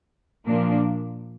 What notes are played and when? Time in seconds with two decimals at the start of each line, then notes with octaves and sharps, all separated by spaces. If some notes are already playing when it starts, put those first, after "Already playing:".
0.46 A#2 F3 A#3 D4